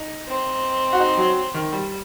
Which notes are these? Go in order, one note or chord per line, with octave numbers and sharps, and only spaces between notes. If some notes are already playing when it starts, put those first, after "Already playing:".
Already playing: D#4
C4
F#4
D#4
F#3
D#3
G3